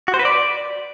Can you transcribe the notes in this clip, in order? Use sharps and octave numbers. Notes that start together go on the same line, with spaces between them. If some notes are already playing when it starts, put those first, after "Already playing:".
F#4
C5
B4
D5